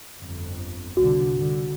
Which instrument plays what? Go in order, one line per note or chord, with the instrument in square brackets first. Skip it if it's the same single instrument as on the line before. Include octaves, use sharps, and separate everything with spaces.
[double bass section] G1 F2
[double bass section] C2 B2 D3 [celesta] F#4
[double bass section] G2 D3